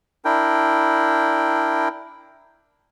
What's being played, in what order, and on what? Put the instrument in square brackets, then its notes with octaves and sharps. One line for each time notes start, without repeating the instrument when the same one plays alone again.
[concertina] D4 E4 A#4 G5